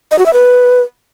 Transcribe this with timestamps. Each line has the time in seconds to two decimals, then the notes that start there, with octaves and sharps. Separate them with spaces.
0.11 D#5
0.19 F#4
0.26 E5
0.33 B4